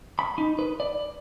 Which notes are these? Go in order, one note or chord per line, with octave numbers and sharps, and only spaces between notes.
B5
D#4
B4
D5